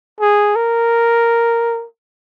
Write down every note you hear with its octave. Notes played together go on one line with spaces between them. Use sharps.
G#4
A#4